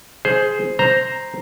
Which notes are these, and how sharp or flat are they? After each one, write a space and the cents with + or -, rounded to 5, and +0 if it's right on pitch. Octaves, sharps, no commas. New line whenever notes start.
G#4 +15 C5 +0
C5 +0 A#5 +0